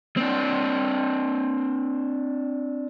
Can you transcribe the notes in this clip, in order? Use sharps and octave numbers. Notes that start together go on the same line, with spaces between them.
C4 D4